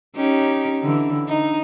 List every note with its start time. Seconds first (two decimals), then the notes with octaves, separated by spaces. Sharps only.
0.16 C#4 D#4 G4
0.82 D3 E3
1.28 D#4